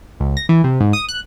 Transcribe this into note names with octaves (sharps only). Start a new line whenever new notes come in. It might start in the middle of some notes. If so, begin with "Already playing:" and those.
C#2
A#6
E3
C3
G#2
D#6
F#6